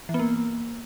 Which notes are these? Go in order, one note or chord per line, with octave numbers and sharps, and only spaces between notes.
E3
B3
A#3